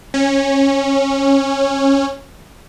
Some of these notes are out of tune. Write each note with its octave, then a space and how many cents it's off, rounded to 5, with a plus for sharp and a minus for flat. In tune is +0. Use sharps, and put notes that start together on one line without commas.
C#4 -15